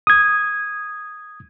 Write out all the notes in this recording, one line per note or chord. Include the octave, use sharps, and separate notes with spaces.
D#6 G#6